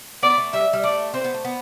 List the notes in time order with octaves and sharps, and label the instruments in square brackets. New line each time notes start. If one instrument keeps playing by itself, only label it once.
[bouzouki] B3 [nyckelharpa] D5
[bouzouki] A3
[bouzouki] G3 [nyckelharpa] E5
[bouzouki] G3
[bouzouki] A3 [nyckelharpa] D5
[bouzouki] C4 [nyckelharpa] C5
[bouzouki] B3
A3
B3